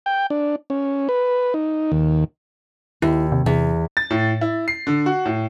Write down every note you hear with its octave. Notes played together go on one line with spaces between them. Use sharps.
G5
D4
C#4
B4
D#4
D#2
D#2 E4
C3
E2 C3
A6
A2
E4
C7
D3
F#4
A2